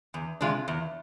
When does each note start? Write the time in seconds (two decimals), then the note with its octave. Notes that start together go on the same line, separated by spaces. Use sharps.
0.14 E2
0.41 C3 G#3 D4 F4
0.68 E2